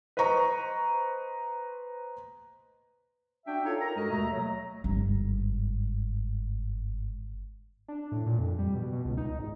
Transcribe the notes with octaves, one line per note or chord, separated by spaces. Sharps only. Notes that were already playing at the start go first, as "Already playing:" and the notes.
B4 C5 D#5 A#5 C#6
D4 F#4 E5 G5
D#4 F4 A4 C#5
A#4 A#5
G2 G#3 F#4 A4 A#4 D#5
D#2 B2 A3 E5 A#5
F#3
G1 G#2
D4
A2
A#2
F2
G3
B2
B2
C#2
D#4
G#1